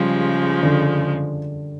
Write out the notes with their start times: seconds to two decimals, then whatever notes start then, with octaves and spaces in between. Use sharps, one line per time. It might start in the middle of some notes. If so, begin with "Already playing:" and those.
Already playing: C#3 F3 G3 G#3 G4
0.63 D3 D4